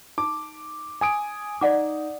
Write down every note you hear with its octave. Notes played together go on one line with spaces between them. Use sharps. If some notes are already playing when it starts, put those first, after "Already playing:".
D#4 D6
G#5 D#6 D7
D#4 D5 F#5 D6